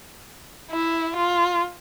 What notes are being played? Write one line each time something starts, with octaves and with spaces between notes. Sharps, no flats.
E4
F4